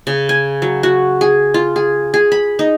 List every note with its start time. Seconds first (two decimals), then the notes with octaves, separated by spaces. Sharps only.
0.07 C#3
0.29 G#5
0.62 F#3
0.83 F#4
1.21 G#4
1.54 F4
1.76 G#4
2.14 G#4
2.32 B5
2.59 D#4